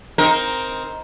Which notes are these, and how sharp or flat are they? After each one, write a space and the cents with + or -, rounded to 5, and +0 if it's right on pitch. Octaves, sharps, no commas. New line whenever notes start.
C4 +0 D#4 +15 A#4 +10